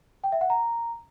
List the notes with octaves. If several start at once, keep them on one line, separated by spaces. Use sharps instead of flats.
G5
E5
F#5
A#5